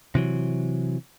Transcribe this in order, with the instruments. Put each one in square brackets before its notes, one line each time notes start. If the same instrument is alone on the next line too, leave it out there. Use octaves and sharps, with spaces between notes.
[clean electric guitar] C3 E3 F#3